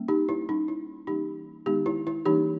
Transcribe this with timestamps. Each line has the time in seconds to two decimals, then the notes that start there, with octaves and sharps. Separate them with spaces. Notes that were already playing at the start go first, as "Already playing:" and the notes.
Already playing: G3 A#3 C#4
0.08 D#4 G4
0.29 E4
0.49 G3 A#3 C#4 D#4
0.68 E4
1.07 E3 G3 A#3 C#4 D#4 G4
1.66 D#3 G#3 B3 D#4 G4
1.86 E4
2.07 E4
2.25 E3 G3 A#3 C#4 D#4 G4